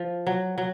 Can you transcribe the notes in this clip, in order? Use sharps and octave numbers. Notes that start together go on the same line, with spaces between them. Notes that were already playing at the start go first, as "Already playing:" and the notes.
Already playing: F3
F#3
F#3